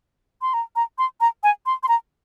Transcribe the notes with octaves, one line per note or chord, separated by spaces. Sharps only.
C6
A#5
A#5
C6
A#5
G#5
C6
C6
A#5